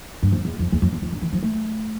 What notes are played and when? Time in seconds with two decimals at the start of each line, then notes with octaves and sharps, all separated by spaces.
0.23 G2
0.32 F2
0.45 E2
0.59 F2
0.72 E2
0.82 F2
0.93 E2
1.02 F2
1.13 G2
1.22 E3
1.33 F3
1.43 A3